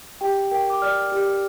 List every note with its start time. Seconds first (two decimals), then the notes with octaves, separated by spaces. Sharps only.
0.21 G4 G5
0.51 A#4 G5
0.70 D6
0.82 D5 F6
1.12 G4